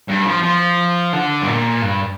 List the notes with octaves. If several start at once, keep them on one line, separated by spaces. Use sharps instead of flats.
G2
F3
F3
D3
G2
A#2
G2